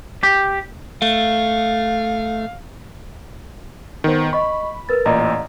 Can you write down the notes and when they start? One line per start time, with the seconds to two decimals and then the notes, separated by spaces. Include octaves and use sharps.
0.23 G4
1.02 A3 F5
4.04 D#3 B3 C5
4.33 D#5 B5 C#6
4.89 A#4 B4 A6
5.06 A1 A#2 D5 D#5 A#5